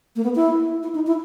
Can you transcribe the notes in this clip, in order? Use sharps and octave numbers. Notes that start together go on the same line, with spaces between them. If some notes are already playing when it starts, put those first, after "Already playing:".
A#3
B3
E4
E4
D#4
E4